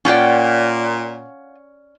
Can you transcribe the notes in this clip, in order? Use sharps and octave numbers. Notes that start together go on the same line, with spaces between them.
A#2 C#4 F4 D5 F#5 G5